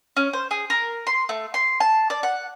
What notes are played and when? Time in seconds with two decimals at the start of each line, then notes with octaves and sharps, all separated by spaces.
0.17 C#4
0.33 C5
0.51 G#4
0.70 A#4
1.07 C6
1.29 A3
1.54 C6
1.80 A5
2.10 D5
2.23 F#5